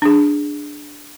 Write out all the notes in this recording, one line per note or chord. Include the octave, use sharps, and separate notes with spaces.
D4 G#4